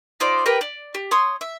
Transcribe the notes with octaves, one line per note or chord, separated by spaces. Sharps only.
D#4 F4 C5 D5
G4 A#4 B4 G5
D5
G4
C#5 C6 D#6
E5